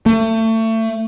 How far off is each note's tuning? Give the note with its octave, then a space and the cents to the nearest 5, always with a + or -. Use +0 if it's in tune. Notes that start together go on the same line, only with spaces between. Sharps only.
A3 +30